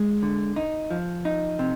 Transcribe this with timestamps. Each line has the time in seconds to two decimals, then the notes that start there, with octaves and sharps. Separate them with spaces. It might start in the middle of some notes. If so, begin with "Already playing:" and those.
Already playing: G#3
0.23 D3
0.56 D#4
0.91 F3
1.25 D#4
1.59 C3